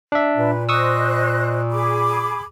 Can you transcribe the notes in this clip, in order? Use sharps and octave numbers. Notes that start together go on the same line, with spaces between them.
D4 E5
A#2 B4
C5 D#5 C#6 D#6 E6 F#6
G#4 B5 D6